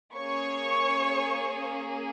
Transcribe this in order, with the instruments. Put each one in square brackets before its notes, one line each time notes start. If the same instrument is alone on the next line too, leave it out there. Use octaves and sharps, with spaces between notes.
[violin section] A#3 C#4 G#4 C#5 C#6